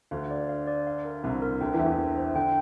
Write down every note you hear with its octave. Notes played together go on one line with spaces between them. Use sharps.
D2 D3 F5
D5
F5
D5
F5
A#4
C2 C3 E4
A#4
D2 D3 G5
E2 E3
E5
E2 E3
G5
C5
D3 G5